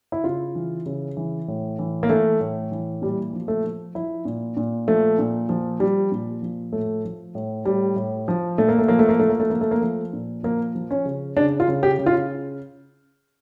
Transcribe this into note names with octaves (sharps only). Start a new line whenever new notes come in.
E4
C#3 F4
E3
C#3
E3
A2
E3
A#3
E3 A3
A2
E3
A#2 G3
F3
A3
F3
F3 E4
A#2
A#2
F3 A3
A#2
F3
F3 G3
A#2
F3
A2 A3
F3
A2
A2 G3
A2
F3
A#2 A3
A#3
A3
F3 A#3
A3
A#3
F3 A3
A#3
A3
F3 A#3
A3
A#3
F3 A3
A#2
F3 A#3
F3
C#4
C#3
C#3 D4
F4
C#3
G4
C#3
F4